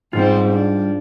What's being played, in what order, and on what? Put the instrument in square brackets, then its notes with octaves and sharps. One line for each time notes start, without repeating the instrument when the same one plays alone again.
[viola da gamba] G#2 C4 [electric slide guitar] G3 F4
[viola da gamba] D4